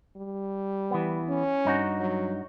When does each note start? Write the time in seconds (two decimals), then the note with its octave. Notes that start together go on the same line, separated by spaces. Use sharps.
0.17 G3
0.91 E3 B3
1.29 C#4
1.65 G2 D#4 F#4
2.00 F#3